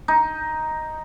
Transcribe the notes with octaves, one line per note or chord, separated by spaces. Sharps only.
D#4